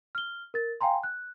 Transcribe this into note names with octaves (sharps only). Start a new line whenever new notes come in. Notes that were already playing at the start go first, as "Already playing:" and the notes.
F6 G7
A#4 A6
F5 G5 G#5 A#5 C6
F#6